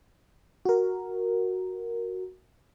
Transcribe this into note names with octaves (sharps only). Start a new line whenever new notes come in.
F#4 A#4